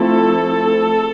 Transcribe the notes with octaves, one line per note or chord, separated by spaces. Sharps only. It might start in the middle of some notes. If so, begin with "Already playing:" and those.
Already playing: F3 A3 C4 E4 A4